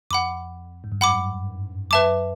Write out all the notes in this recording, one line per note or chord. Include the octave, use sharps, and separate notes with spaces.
F2 F#5 B5 D6
G#2
G2
F#2 F#5 B5 D6
F#2 B4 E5 A5 D6